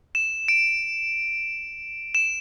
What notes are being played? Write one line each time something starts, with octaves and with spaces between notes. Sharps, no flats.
E7
D7
E7